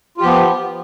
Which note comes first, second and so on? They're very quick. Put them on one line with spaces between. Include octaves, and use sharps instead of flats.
F4 G4 F3 B3